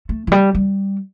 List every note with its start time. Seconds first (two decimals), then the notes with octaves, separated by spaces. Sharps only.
0.09 A3
0.27 E3
0.32 G3
0.55 G3